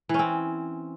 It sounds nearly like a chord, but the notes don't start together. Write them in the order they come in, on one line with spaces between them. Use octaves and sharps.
E3 C#4 C4